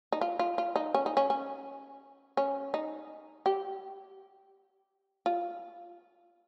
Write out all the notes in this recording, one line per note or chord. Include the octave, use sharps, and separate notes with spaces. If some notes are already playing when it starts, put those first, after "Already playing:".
D#4
F4
F4
F4
D#4
C#4
D#4
C#4
C#4
C#4
D#4
G4
F4